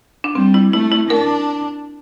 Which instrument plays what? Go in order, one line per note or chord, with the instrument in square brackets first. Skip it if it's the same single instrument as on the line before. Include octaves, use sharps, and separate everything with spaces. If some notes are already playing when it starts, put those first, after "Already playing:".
[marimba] D4
[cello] G3 [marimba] C4
[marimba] E4
[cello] A3 [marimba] E4
[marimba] E4
[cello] D4 [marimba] A#4